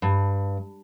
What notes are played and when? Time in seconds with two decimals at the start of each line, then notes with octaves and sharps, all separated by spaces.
0.02 G2